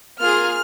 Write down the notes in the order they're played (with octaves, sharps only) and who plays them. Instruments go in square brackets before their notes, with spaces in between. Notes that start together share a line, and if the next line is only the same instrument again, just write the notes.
[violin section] A#3 F4 G#4 F6